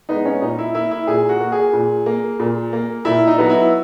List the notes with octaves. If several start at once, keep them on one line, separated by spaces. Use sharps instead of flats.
G#3 B3 D#4
C#4
A#2 D#4
E4
A#3 E4
E4
A#2 G#4
F#4
A#3
G#4
A#2
A#3
A#2
A#3
A#2 E4
D#4
F#3 B3
E4